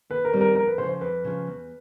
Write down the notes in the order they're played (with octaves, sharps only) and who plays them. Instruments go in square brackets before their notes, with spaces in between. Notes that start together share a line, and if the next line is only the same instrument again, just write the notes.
[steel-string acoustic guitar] D#2 [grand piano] B4
[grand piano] A#4
[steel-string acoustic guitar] D#3 G3 C4
[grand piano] A#4
[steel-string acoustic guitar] F2 [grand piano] A#4
[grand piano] B4
[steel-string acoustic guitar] C#3 [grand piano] C5
[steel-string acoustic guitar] F3
[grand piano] C5
[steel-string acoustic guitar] F2 [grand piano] B4
[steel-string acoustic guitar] C#3 F3
E2